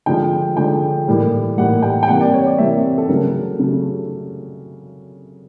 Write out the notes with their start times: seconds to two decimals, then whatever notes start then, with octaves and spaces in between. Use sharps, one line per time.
0.06 D3 F3 G#3 G5
0.57 D3 F3 G#3 G5
1.08 A2 E3 G3 A#3
1.58 A2 E3 G3 A#3 F#5
1.82 G5
2.03 G5
2.08 C3 E3 G3 A#3 F#5
2.21 D5
2.34 C#5
2.46 D5
2.58 C3 E3 G3 A#3 E5
2.98 A4
3.09 C#3 F#3 A3 A#4
3.60 C#3 F#3 A3